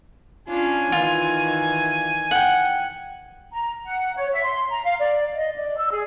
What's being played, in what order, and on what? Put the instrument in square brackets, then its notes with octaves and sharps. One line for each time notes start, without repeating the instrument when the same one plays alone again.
[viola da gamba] C#4 D4 F4 [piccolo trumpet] G#5
[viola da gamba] D#3 E3 [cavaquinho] F4
[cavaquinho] F#5 G5
[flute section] A#5
F#5
C#5
E5
C6
A#5
F5
D5
D#5
D5
E6
G#4